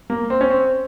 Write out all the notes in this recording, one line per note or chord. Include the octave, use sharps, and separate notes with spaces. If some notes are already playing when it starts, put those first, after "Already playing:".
A#3
C4
C#4
C4